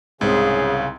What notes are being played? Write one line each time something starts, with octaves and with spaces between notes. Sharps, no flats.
C2 G#2 C#3 C4 G#4